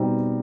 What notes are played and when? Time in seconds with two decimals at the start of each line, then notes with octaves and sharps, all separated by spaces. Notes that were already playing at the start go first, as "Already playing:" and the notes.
Already playing: B2 G3 C4 D#4